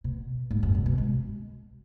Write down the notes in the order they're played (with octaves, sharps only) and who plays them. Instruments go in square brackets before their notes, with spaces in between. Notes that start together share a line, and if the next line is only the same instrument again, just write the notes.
[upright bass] B2
G#2
F#2
B2
B2
G#3